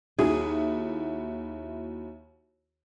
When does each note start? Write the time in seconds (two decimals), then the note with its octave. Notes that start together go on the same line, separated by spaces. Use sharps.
0.19 D#2 E4 F#4 G#4